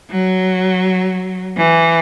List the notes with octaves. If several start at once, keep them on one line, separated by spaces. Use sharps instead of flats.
F#3
E3